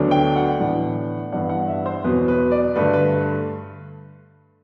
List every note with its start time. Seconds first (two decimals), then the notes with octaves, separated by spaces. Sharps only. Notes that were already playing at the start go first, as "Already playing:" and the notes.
Already playing: D2 D3 F#3 B3 D4
0.11 G5
0.36 F#5
0.60 A2 E3 B3 D4
1.32 G2 E3 B3 D4 F#5
1.49 F#5
1.68 E5
1.86 C5
2.04 E2 B2 F#3 B4
2.28 B4
2.51 D5
2.76 G2 D3 A3 B4
2.93 B4